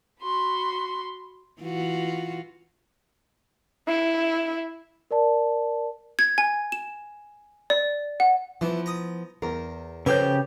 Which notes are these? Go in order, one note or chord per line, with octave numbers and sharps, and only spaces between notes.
F#4 B5 C6
E3 F4 F#4
E4
A#4 D5 A5
G#6
G#5
E7
D5
F#5
E3 F3 B3 E4
A#5 D#6
E2 A#4
C#3 F3 G4 A4 B4 C#5 G6